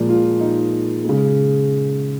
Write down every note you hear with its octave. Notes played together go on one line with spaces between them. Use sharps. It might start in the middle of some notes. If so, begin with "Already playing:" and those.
Already playing: A#2 F3 G#3
F4
D#4
C#3 G#3